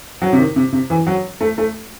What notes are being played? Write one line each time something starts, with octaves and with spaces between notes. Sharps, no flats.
F#3
C3
D#3
C3
C3
E3
F#3
A3
A3